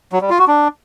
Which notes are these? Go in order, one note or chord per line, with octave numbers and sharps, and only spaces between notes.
F#3
G3
F4
F#4
D4